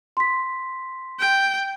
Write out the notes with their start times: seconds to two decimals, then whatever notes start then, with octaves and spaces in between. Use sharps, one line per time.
0.17 C6 B6
1.19 G5